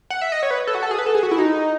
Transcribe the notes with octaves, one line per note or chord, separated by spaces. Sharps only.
F#5
E5
D#5
C#5
B4
A4
F#4
A4
G#4
B4
A4
G#4
F#4
E4
D#4